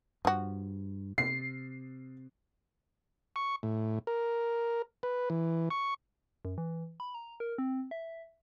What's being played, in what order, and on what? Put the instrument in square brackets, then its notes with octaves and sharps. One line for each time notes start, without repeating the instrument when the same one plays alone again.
[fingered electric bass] G2 [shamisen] F3 F#4
[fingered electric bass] C3 [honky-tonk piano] C7
[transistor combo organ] C#6
A2
A#4
B4
E3
C#6
[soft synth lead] F#2
E3
B5
A#5
A#4
C4
E5